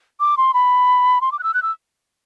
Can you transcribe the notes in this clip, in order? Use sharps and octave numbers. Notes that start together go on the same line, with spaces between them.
D6
C6
B5
C6
D6
F#6
E6
F#6
E6